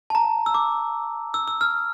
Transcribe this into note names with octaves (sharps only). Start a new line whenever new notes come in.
A5
A#5
E6
D6
E6
E6
F6